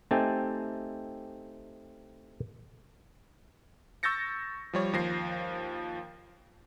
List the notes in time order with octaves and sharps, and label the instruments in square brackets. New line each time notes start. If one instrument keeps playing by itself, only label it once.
[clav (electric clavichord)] A3 C4 D#4 G4 G#5 A5
[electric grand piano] C#6 E6 G6 A6 A#6 C#7
F3 G3 C#5
D#2 F3 A#6 C7